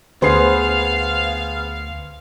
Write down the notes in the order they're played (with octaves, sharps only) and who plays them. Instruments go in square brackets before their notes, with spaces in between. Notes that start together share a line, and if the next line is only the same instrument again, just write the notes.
[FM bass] D2 [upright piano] B3 G#4 C7 [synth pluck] B4 C5 [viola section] F5